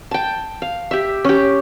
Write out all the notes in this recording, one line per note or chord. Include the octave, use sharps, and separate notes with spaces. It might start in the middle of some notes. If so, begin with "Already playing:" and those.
G5 A5
F5
G4 E5
C#4 G4